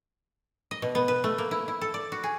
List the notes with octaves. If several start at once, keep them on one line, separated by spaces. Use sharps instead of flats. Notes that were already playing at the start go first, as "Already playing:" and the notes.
D#5
B2
B3
B4
A3
A#3
E4
E4
A4
D5
F#4
G#4